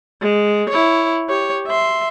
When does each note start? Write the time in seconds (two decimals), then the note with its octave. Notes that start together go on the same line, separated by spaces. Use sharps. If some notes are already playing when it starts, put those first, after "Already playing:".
0.22 G#3
0.70 E4 C#5
1.28 G4 C#5
1.67 E5 C6